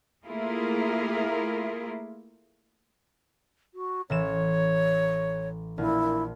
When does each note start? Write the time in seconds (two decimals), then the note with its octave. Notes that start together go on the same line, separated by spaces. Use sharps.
0.25 A3 A#3 E4 F4 G#4 A#4
3.74 F#4
4.10 A1 E3 C#5 E7
5.78 A#1 E4